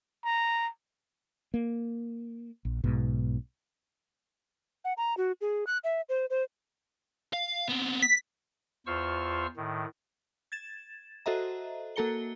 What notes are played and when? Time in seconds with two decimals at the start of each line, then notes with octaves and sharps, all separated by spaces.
0.25 A#5
1.54 A#3
2.65 A#1
2.84 B1 G#2 B2
4.85 F#5
4.97 A#5
5.17 F#4
5.41 G#4
5.67 F#6
5.84 E5
6.09 C5
6.30 C5
7.33 F5
7.69 B3 C4
8.02 B6
8.87 E2 F4 C5 C#6 E6 F6
9.57 A2 D#3
10.52 G#6 A6 E7
11.26 F#4 A4 C5 D#5 E5 A#5
11.96 A#3 F#4 A4 A#5 C#7 G7